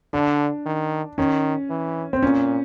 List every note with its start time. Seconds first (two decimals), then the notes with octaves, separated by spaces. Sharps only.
0.13 D3 D4
0.66 D#3
1.18 D#3 C#4
1.70 E3
2.13 C4
2.23 A#2 C#4